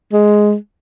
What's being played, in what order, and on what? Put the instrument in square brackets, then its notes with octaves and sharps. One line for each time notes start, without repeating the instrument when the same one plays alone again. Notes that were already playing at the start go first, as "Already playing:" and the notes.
[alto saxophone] G#3